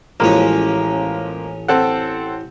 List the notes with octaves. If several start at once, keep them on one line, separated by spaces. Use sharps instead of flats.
A1 F3 G#3 A#3 C#4
C4 A4 F#5